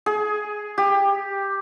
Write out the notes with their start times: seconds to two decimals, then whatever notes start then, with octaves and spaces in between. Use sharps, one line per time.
0.06 G#4
0.78 G4